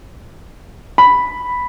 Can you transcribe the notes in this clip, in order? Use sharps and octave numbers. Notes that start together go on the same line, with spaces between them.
B5